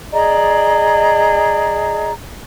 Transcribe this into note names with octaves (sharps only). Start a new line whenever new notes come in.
G#4 D5 D#5 A#5